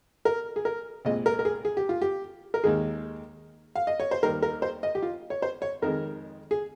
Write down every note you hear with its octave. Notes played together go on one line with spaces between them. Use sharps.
A#4
G#4
A#4
C2 A#2 G#3 D#5
A#4
A#4
G#4
G#4
G4
F4
G4
A#4
D#2 D#3 G#3 G#4
F5
D#5
C#5
C5
D#2 D#3 G3 A#4
A#4
C5
D#5
G4
F4
C#5
C5
C#5
F2 D#3 G#3 A#4
G#4